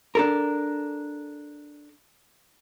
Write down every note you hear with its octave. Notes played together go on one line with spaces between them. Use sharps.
D4 A4 A#4